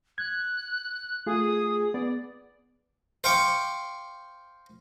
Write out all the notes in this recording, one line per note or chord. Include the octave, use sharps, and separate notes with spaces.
F#6 G#6
A3 F4 G#4 D#6
B3 D5
C5 F5 G5 C#6 D6